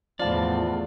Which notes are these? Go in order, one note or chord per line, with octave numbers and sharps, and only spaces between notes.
E2 A2 F3 F4 D5 A5